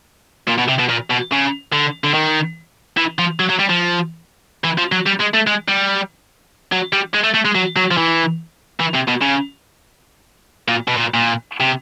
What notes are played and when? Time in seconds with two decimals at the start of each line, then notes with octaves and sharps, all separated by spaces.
0.48 A#2
0.58 B2
0.69 C3
0.79 B2
0.89 A#2
1.10 B2
1.32 C#3
1.73 D3
2.04 D3
2.14 D#3
2.97 E3
3.18 F3
3.40 F#3
3.50 F#3
3.60 G3
3.70 F3
4.64 E3
4.78 F3
4.92 F#3
5.06 G3
5.20 G#3
5.34 A3
5.47 G#3
5.68 G3
6.72 F#3
6.93 G3
7.14 G#3
7.24 A3
7.34 A3
7.45 G#3
7.55 F#3
7.76 F#3
7.91 F3
7.97 E3
8.80 E3
8.94 C3
9.08 B2
9.21 C#3
10.68 A#2
10.88 B2
10.96 A#2
11.14 A#2
11.60 C3